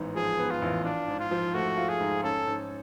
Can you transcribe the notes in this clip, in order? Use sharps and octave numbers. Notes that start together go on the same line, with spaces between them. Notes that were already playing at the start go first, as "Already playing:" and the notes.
Already playing: A1 G#2 B3
F3 G#4
B3
F4
A1
D4 F4
G#2
F4
F3
A3 F#4
F4
G#4
G#2
C#4 A4
G#2